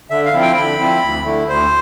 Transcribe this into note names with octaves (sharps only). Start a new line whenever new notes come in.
D3 E5
F5
F3 C4 E4
G5
D3 B5
F3 C4 E4
D2
D3 A3 E4
D2 C5